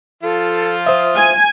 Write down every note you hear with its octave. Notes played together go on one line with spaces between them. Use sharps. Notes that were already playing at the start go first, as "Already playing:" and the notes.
F3 F4 A4
C5 E5 D#6
G#5